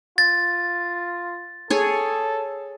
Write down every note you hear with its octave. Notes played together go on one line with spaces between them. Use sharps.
F4 A6
G#4 A4 C#5